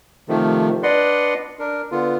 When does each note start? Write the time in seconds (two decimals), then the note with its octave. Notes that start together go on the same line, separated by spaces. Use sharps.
0.29 C3 D#3 F3 A3
0.83 D4 B4 D5 D#5 F#5 C6
1.59 D4 A#4
1.91 D3 B3 F4